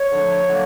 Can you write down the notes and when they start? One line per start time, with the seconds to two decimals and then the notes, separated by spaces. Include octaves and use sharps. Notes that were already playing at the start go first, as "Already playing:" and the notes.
Already playing: C#5
0.12 D3 F3 A3 D4
0.50 D3 F#3 A#3